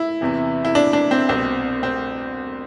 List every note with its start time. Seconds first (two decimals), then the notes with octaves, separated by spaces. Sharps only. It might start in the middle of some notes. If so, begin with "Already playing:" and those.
Already playing: E4
0.21 E2 C3 E3
0.65 E4
0.75 D4
0.93 D4
1.11 C4
1.29 C2 B2 C4
1.83 C4